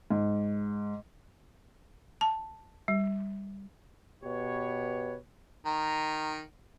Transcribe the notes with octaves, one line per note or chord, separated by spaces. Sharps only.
G#2
A5
G3
B2 G4 B4 C#5
D#3 A#5